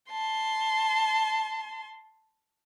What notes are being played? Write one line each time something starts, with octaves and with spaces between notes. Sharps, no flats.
A5 C6